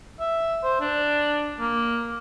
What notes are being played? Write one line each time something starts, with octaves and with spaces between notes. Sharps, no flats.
E5
C5
D4
A#3